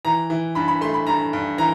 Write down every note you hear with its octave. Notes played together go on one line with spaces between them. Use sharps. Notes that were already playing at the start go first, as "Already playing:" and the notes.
E3 A#5
E3
G2 B5
B5
A3 C6
B5
G2 A#5
G2
E3 A#5